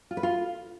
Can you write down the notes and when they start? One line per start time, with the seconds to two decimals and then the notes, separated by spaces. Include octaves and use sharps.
0.11 F4
0.17 B4
0.23 F4